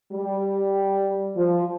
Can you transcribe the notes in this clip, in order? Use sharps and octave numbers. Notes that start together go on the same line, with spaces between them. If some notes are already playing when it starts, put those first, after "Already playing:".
G3
F3